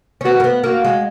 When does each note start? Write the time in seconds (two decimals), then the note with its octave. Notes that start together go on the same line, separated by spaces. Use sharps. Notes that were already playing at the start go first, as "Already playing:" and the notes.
0.21 C#4
0.25 B3 F#4
0.40 A#3
0.44 B3
0.64 A#3 F#4
0.84 G#3